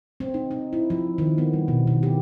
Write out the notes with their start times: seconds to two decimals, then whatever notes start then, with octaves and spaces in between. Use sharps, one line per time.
0.20 C4
0.34 D#4
0.51 D#4
0.73 E4
0.90 F3
1.18 D#3
1.38 B3
1.53 G3
1.68 B2
1.87 D#3
2.03 G4